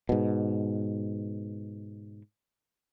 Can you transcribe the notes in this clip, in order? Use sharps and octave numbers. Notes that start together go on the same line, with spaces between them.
G#2 B2